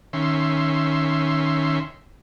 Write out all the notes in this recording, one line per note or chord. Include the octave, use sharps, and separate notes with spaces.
D#3 C#4 E5 C6